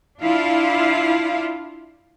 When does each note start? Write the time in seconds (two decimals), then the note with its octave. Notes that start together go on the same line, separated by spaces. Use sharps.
0.21 D4 E4 F4 F5